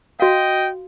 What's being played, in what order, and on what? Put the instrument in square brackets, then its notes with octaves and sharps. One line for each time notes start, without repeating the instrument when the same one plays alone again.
[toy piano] F#4 F5 [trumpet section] D#5 G5